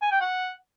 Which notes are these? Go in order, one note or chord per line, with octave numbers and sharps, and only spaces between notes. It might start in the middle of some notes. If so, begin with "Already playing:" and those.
G#5
G5
F#5